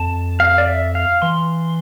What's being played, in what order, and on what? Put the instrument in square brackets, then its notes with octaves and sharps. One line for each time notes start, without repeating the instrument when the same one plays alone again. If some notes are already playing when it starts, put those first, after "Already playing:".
Already playing: [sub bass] F2 [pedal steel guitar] A5
[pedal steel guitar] F5
D5
E5
F5
[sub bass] E3 [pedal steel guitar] C6